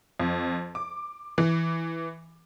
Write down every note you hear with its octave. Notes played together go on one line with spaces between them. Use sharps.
F2
D6
E3